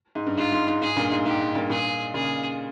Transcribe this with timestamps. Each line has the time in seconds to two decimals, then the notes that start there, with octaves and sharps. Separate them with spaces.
0.15 G#2
0.27 G2
0.37 G#2 F4
0.52 G#2
0.67 G#2
0.81 G#2 G#4
0.96 G2 A#2
1.11 G#2
1.25 G#2 G4
1.40 G#2
1.55 G2 A#2
1.70 G2 A#2 G#4
2.14 A#2 C#3 G#4